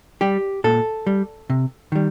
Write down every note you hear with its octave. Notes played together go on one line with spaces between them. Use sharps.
G3 G4
A#2 A4
G3
C3
D#3 G3